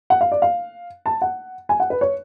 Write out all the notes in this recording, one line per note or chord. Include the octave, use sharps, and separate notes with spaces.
F#5
F5
D5
F5
A5
F#5
G#5
F#5
B4
C#5